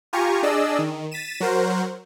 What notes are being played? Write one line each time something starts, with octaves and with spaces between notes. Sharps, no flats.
F4 G4 G#5 A#5 C#6
D4 G#4 D5 D#5 E6
D#3
A6 B6 D#7 E7
F#3 F#4 A#4 C5